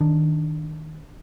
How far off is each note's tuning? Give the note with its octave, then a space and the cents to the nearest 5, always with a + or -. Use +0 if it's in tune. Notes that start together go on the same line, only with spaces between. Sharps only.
D#3 +5 D4 +0